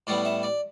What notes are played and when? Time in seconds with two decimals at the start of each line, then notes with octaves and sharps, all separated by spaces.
0.07 A2 G3 B3 D5
0.25 E5
0.43 D5